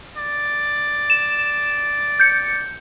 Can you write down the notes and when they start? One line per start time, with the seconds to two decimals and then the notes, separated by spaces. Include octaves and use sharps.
0.17 D5
1.10 E7
2.20 G6 C#7